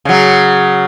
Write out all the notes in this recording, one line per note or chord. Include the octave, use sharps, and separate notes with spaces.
C#3 F#3